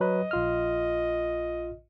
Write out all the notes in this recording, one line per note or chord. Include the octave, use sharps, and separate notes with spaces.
F#3 B4 D#5
A#1 F4 F6